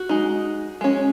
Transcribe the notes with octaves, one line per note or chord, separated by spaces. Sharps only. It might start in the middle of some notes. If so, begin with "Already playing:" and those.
Already playing: F#4
G#3 D#4
G#3 C#4